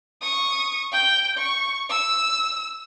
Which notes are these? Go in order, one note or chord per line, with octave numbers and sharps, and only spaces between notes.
C#6 D#6
G5 G6
C#6
E6